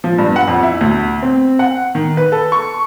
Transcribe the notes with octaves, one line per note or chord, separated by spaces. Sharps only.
F3
G2
F#5
F2
E4
D2
C4
F#5
D#3
B4
A4
C#6